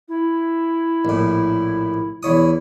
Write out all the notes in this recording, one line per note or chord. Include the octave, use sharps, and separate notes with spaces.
E4
A#1 A2
E2 E4 C#5 D#6